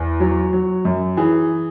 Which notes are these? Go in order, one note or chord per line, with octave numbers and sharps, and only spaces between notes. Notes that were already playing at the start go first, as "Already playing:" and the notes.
Already playing: E2
F#3
F#3
F#2
E3 G#4